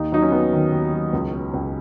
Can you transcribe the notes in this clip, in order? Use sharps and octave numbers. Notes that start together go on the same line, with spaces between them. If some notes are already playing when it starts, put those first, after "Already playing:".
Already playing: D#2 D#4
F#3 D#4
C#4
B3
D#3
D#2
F#3
C#2
B3
C#2